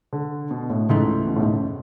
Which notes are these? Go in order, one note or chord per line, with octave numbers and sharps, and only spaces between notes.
D3
B2
A2
C#2 G#2 C#3 E3 A3
B2
A2
G#2
F#2